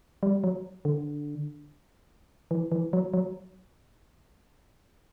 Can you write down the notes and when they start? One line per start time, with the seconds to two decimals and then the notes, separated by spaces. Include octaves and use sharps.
0.23 G3
0.44 F#3
0.85 D3
2.51 E3
2.72 E3
2.93 F#3
3.14 F#3